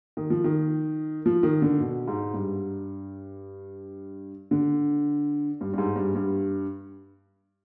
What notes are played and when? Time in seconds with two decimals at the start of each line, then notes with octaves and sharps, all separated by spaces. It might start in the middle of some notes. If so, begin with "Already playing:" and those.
0.17 D#3
0.30 F3
0.44 D#3
1.26 F3
1.43 D#3
1.62 D3
1.80 B2
2.08 G#2
2.34 G2
4.51 D3
5.61 G2
5.73 G2
5.78 G#2
5.96 G2
6.15 G2